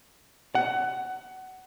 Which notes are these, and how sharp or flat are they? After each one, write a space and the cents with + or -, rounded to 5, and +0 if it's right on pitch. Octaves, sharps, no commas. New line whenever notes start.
F#5 +20